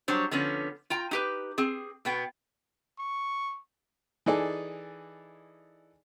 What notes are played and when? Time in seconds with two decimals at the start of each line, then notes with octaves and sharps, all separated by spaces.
0.08 F#3 G3 D4 C5 C#5
0.31 D3 F3 B3 C#4
0.90 F4 G5 A#5
1.11 D#4 G4 B4
1.58 C4 G#4
2.05 B2 B3 G5
2.99 C#6
4.26 E3 D#4 G#4 A4 D5